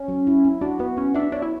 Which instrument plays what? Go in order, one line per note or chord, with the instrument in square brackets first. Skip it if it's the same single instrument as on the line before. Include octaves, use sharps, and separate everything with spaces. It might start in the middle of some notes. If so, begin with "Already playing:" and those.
Already playing: [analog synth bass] C#4
[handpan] F#3
E4
E4
[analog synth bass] D4 [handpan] F#4
[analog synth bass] B3 [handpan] F#4
[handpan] B3 [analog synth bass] C#4
[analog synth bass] D4 [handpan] E5
[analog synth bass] D4 [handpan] C#5
[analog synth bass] E4